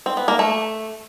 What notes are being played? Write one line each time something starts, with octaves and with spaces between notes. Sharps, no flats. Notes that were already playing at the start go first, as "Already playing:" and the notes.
C4
B3
A#3
A3